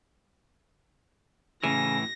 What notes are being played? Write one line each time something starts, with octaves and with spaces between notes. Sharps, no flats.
A2 C#3 E3 A#6